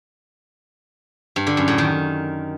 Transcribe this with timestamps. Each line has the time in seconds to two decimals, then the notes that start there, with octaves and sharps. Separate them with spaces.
1.36 G2
1.47 D3
1.57 F#2
1.68 A2
1.78 D#3